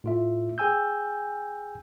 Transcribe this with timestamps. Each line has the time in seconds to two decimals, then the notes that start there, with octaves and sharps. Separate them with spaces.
0.04 A2 F4 E5
0.58 G#4 G5 G#5 E6 G6